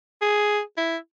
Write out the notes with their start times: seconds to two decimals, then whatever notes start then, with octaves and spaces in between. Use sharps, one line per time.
0.22 G#4
0.77 E4